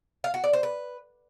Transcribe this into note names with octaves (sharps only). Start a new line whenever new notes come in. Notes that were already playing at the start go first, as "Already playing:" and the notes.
F5
F#4
D5
C5
B4